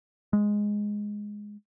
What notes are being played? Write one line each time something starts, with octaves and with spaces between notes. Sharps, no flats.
G#3